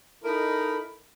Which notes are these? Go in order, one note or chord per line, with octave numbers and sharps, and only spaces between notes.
D#4 E4 A4 A#4 D#5 B5